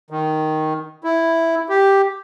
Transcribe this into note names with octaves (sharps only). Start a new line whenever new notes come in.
D#3
E4
G4